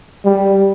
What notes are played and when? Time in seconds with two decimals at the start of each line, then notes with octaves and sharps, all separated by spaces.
0.25 G3